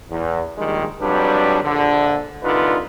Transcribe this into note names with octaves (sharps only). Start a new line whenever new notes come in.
E2
A#1 D#3 G3 G#3
F2 F#3 G3 D4 B4
A#1 D3
C2 D3 D#4 F4 B4